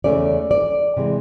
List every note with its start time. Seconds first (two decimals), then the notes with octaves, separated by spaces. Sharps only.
0.04 E2 C#3 F#3 A3 C#4 D5
0.51 D5
0.97 C3 E3 G#3